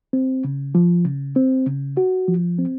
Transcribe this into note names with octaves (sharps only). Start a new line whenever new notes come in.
C4
C#3
F3
C#3
C4
C#3
F#4
F3
C4